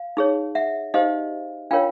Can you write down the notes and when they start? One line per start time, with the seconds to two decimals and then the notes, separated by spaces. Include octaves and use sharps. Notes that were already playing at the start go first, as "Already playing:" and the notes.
Already playing: F5
0.17 D#4 G#4 C#5
0.55 E5 F#5
0.94 D#4 G4 C5 D#5 F5
1.71 D4 F4 A#4 C#5 F5 G5